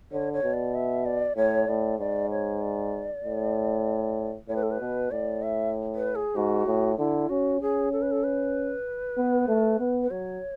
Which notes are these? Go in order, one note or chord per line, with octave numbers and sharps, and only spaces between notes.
D3 C#5
C#5
B2
D5
E5
D5
A2 C#5
A2 D5
G#2 D5
C#5
D5
A2
A2 C#5
B4
A4
B4
B2
A2 D5
E5
B4
G#4
G#2 F#4
A2
D3 E4
C#4 F#4
C#4 G#4
A4
B4
A4
B4
B3
A3
B3
B4
F#3 C#5